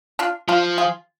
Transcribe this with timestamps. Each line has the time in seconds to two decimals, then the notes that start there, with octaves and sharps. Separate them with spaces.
0.19 D4 F4
0.48 F3 D4 F4
0.78 F4 G#4